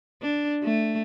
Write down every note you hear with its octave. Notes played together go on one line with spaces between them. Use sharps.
D4
A3